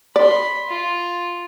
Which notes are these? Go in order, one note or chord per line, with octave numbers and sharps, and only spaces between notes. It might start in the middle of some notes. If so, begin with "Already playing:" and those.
D5 B5 C6
F4